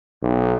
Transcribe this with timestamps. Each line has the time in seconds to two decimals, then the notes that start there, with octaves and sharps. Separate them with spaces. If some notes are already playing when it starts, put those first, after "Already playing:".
0.23 B1